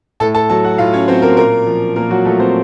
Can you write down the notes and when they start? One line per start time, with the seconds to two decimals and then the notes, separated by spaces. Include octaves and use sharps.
0.20 A2 A4 A5
0.35 A4 A5
0.50 F#3 A4 A5
0.64 F#4 F#5
0.78 A2 F4 F5
0.93 C#4 C#5
1.08 F#3 C4 C5
1.22 A#3 A#4
1.37 A#2 A#3 A#4
1.67 F3
1.96 A#2 A#3 A#4
2.10 F#3 F#4
2.25 F3 A3 A4
2.40 C4 C5